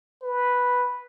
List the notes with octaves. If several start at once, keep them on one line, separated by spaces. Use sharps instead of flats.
B4